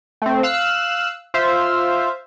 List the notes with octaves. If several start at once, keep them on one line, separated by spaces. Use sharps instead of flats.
A3 C4
F5 E6 F#6
F4 C5 E5 F5